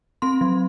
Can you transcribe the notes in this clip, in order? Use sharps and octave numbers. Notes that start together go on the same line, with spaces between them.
C4 C6
F#3